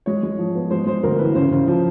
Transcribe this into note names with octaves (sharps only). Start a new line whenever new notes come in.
G#3 C#5
G#3
F3
B3
G#3 C5
G#3 C5
D2 A#4
E3 B4
C#3 C5
C#3
F3